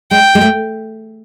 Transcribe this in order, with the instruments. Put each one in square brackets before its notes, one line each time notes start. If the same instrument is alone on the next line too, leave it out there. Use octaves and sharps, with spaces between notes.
[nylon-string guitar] G#3 [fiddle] G5
[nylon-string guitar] G#3
A3